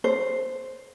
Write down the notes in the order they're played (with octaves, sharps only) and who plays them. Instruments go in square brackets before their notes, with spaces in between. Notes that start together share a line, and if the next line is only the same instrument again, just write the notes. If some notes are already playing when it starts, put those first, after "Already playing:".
[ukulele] C5